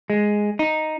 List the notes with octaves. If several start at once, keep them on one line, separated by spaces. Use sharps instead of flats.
G#3
D#4